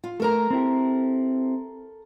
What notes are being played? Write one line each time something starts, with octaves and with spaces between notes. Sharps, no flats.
F4
A3 A4 A#4 A#5
C4 E4 G4